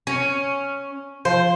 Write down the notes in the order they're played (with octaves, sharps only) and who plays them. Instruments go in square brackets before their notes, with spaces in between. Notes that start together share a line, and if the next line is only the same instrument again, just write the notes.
[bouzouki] C#4 [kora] C#5
[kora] F3 [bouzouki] C5